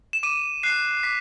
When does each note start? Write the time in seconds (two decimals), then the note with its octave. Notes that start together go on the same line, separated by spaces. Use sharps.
0.13 E7
0.23 D6 D#7
0.63 F#6 C7
1.03 D6 B6